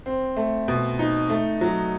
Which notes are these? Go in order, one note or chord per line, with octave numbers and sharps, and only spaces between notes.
C4
A3
B2
D#4
A3
F#3